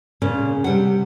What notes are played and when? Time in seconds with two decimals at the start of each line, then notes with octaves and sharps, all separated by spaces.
0.22 A#2 C#3 C#4
0.64 C3 G3 F#5